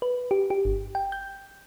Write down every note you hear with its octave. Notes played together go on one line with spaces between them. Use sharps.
B4
G4
G4
G1
G5
G6